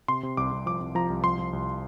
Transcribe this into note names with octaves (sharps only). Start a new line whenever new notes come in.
C3 C6
C3
C2 D6
C2
F3 D6
C2
F3 A#5
C2
F3 C6
F3
C2